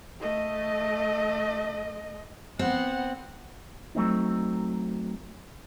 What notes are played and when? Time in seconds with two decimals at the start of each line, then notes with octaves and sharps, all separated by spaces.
0.20 A3 D#5
2.59 B3 C4 F#5
3.95 F#3 A3 C4 D#4